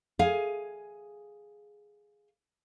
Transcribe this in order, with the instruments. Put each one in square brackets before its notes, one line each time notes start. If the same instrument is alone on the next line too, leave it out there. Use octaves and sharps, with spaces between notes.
[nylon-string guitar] G#4 F5 G#5